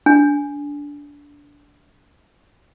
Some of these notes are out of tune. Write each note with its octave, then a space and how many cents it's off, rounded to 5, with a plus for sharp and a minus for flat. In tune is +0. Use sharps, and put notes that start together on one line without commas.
D4 -20 G#5 -5